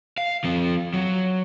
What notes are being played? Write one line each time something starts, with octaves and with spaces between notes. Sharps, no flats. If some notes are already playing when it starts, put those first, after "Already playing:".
F5
F3 C4
F#3